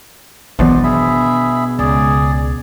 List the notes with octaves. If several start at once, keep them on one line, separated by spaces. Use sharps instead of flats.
G#1 B2 D#3 E3 F#3 D4 C5 D5
G#4 E5 B5
C#2 G#4 D5